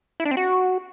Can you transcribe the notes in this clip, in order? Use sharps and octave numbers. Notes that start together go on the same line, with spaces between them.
E4
D4
C4
F#4